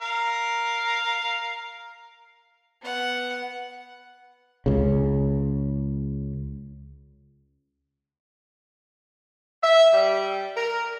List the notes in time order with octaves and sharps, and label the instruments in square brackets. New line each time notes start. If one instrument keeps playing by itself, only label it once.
[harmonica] A#4 F5
[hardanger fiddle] B3 F#5
[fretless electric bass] C#2 C#3
[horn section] E5
G3
A#4